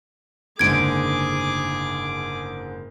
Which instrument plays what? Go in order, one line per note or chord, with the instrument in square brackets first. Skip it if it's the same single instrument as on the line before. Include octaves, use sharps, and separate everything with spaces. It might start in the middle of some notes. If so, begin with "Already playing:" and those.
[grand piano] F#1 G#2 D3 [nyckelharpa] G#4 D6 [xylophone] G#6 D7